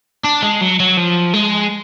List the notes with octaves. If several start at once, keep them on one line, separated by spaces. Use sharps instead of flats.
D4
G#3
F#3
F#3
F3
G#3